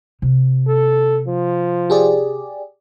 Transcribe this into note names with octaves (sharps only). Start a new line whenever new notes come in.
C3
A4
F3
G4 G#4 D5